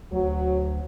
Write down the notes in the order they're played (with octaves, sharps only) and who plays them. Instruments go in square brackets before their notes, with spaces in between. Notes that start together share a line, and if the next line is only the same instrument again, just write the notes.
[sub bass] D2 [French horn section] F#3